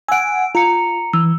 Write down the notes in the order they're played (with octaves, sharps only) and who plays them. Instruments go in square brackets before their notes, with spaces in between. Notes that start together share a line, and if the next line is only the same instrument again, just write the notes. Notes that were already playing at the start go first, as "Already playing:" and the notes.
[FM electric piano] F#5 G#5 [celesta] E6 D7
[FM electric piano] F4 [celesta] A#5 C#7
[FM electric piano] E3 [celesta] E6